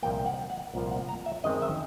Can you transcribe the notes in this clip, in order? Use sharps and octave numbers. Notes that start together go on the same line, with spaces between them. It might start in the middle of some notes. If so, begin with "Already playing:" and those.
C2 A#2 F3 A#3 G5
F#5
F#5
C2 A#2 F3 A#3
F#5
A#5
E5
F#2 D#3 G#3 C4 D#4 D#5
E5